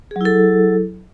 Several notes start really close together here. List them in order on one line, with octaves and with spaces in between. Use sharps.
G#4 F#3 E4 A4